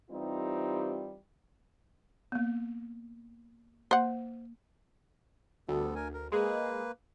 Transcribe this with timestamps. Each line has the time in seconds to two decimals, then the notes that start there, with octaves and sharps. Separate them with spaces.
0.10 E3 G3 C4 D#4 F4 G4
2.32 A#3 B3
3.91 A#3 C5 F#5
5.69 D2 G3 B3 A4
5.95 A#4 G#5
6.14 A#4
6.32 G#3 A#3 G#4 B4